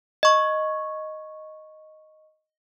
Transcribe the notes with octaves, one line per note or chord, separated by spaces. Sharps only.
D#5 C#6